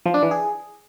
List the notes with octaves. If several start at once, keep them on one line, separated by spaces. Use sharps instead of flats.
F3
D4
E3
G#4